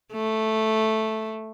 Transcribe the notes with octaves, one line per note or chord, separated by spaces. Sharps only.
A3